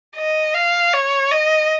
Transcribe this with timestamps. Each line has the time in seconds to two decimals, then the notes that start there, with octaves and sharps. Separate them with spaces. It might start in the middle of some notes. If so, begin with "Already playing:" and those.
0.16 D#5
0.54 F5
0.93 C#5
1.32 D#5